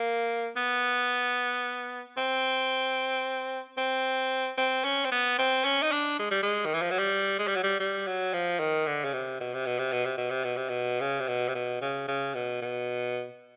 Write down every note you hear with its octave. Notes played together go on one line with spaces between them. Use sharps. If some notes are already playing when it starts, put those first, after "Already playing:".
Already playing: A#3
B3
C4
C4
C4
C#4
C4
B3
C4
C#4
D#4
D4
G#3
G3
G#3
D#3
E3
F3
F#3
G3
G#3
G3
F#3
G3
G3
F#3
F3
D#3
D3
C#3
C3
B2
C3
B2
C3
B2
C3
B2
C3
B2
C3
B2
C#3
C3
B2
C3
B2
C#3
C#3
B2
B2